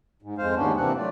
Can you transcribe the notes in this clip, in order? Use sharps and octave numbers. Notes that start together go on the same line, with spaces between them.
G#2
F2 G#3 C5 F5
D#2 G#2 B3 C#4 D4
C3 E3 A#3 C4 D4 F#5
F#3 A3 F4 D5